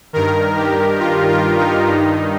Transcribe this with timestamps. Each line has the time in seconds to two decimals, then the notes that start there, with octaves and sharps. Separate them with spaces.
0.13 G2 D#3 A#4
0.57 G4
0.99 F4
1.28 F4
1.57 D#4
1.86 G2 D#3